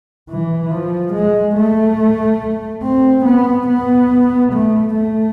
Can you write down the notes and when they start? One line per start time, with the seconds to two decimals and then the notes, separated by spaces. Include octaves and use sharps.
0.29 E3
0.71 F3
1.14 G#3
1.55 A3
2.83 C4
3.25 B3
3.68 B3
4.53 A3
4.95 A3